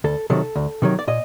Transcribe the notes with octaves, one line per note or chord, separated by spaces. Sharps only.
D2 A4
C3 D#3 F#3 A4
D2
C3 D#3 F#3
D5
A#2 D#5